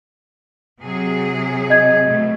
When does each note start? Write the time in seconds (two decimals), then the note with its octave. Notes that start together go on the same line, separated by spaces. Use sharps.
0.81 C3 F#3 G#4
1.70 D#5 G#6
2.04 B2 A3